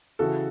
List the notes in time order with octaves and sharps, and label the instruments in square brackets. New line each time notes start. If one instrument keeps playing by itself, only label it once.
[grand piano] C#3 E3 F#4 A4